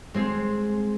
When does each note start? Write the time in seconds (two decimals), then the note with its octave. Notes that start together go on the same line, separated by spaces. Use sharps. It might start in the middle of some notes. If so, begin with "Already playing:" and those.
0.14 G#3 C4 G#4